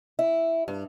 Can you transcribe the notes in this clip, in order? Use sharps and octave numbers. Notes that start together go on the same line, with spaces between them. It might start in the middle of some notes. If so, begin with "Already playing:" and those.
E4
G2